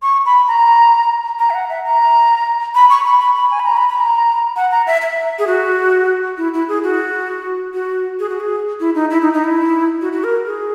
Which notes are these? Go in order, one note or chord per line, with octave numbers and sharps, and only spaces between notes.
C#6
B5
A#5
A#5
E5
F#5
E5
A#5
B5
C#6
B5
B5
B5
G#5
B5
A#5
B5
B5
A#5
F#5
A#5
E5
E5
G#4
F#4
E4
E4
G#4
F#4
F#4
G#4
F#4
G#4
E4
D#4
E4
D#4
D#4
E4
F#4
F#4
A#4
G#4